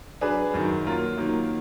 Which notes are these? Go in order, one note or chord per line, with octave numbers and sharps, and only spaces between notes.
F#3 D4 G#4 B4
F#2 D#3 F#3
F#3 A#3 F4 A#4
D#3 F#3 A#3